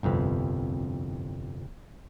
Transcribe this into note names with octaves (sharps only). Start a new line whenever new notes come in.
G1 C2 F2 B4